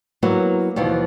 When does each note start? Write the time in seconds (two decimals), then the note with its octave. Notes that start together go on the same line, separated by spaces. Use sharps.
0.23 F#3 A#3 B3 E4 F#4
0.76 D#2 B2 E3 F3